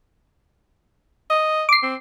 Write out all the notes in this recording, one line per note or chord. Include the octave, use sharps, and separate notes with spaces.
D#5
D6 C7
C4